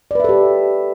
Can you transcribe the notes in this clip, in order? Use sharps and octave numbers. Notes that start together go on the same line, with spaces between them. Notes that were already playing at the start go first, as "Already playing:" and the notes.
G4 A4 B4 D5 E5